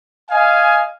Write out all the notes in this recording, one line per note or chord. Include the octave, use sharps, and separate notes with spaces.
D#5 F5 G#5